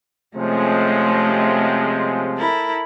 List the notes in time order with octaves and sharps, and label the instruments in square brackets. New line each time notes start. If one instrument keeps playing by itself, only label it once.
[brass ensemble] C3 F3 G#3 [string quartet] A3 C#4
[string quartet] E4 A4 A#4